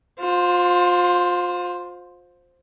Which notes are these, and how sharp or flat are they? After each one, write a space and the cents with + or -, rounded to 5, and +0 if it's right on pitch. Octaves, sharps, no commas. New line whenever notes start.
F4 +30 C5 +0